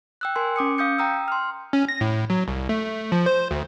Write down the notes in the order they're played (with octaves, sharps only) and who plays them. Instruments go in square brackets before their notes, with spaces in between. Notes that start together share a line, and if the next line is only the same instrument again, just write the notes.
[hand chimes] G5 E6 F#6
A#4 G#5 C6
C#4 D6 D#6 C#7
F5 D#6 G6 C#7
G5 A#5 D#6 E6
C6 F6
[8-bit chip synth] C#4
A#6
A2
F#3
C2
A3
F3
C5
D2